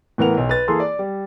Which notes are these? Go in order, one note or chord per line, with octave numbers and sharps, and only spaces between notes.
A2 E3 B3 A#4 F#5 F7
B1
B4 A6
E3 A#3 G#4 A4 C6
D5
G3